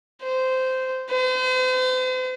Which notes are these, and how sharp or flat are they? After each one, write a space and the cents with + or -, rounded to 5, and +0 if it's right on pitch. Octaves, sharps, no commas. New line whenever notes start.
C5 -15
C5 -40